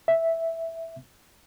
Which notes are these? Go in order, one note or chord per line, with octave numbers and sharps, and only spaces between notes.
E5